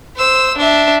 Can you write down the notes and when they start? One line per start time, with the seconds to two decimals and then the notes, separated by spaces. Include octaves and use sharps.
0.16 C5 E6
0.58 D4 E5